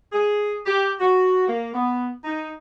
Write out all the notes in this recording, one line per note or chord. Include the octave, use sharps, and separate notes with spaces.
G#4
G4
F#4
A#3
B3
D#4